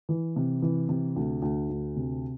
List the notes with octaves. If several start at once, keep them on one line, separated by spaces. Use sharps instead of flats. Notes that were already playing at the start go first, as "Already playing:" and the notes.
E3
C3
E3
C3
D2
D2
D2
C3